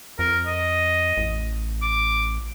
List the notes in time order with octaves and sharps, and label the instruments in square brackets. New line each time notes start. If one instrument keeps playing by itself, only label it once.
[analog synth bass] F2 [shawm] A#4
[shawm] D#5
[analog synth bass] A1
[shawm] D6